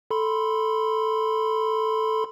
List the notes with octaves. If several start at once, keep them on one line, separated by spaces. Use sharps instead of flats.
A4 B5 C6